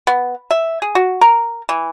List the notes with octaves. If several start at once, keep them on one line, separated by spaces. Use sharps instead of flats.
B3
E5
G#4
F#4
A#4
E3